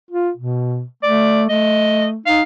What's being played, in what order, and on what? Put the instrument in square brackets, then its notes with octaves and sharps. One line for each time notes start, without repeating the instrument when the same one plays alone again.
[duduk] F4
B2
[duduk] A3 [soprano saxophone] D5
[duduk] A3 [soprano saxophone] D#5
[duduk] D#4 [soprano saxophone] F5